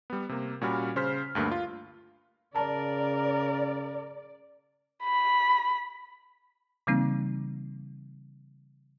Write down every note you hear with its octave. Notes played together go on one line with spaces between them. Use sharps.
G3 B3
C3 A#3
A#2 G3 C#4 F#4 B5 F6
C#3 C5 C6 F6 B6
D2 G2 A3 A#3
F4
C#3 A#4 D5 A5
B5
C#3 E3 G3 A#3 C4 D#4